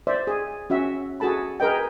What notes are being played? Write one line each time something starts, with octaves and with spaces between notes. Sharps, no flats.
C5 D5 E5
G#4
C#4 F#4 E5
F#4 G#4 A4 A5 B5
G#4 A#4 B4 D#5 G5